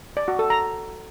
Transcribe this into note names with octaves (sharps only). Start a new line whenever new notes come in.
D5
F#4
A4
A#5